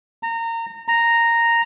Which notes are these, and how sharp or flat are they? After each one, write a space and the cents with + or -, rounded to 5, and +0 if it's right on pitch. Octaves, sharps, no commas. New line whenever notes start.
A#5 -25
A#5 -5